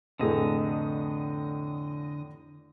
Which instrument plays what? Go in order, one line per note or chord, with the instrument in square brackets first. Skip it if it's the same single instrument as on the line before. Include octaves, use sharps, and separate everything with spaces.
[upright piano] F1 A2 G#4 [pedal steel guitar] D3 D#5